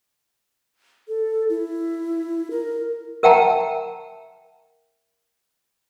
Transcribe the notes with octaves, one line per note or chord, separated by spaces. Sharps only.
A4
E4
A#4
A#4 E5 F#5 G5 A5 A#5